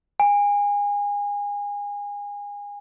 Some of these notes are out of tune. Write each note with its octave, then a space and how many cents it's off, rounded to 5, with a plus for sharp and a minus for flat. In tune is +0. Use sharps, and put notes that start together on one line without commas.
G#5 -30